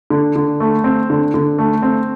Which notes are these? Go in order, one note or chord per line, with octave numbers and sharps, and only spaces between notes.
D3
D3
A3
C4
D3
D3
A3
C4